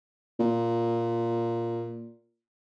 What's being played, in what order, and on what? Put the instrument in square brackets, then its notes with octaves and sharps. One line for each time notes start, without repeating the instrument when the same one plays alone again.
[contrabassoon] A#2